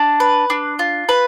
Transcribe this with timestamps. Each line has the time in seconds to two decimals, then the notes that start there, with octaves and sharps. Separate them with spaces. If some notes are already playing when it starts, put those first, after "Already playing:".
Already playing: D4
0.20 B4
0.50 D4
0.79 F4
1.09 B4